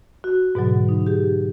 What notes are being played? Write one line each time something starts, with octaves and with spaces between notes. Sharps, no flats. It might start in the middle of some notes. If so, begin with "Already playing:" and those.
F#4
G#2 B2 D3 F#3
D#4
G4 G#4